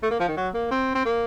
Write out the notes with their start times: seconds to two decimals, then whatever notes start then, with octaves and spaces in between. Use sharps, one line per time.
0.03 A3
0.11 A#3
0.20 F3
0.28 D#3
0.37 F#3
0.54 A#3
0.71 C4
0.95 C4
1.05 A#3